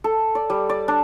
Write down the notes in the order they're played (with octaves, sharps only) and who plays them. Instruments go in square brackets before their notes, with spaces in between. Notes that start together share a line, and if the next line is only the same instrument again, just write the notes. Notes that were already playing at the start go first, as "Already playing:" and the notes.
[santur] A4
D5
G3
D5
D4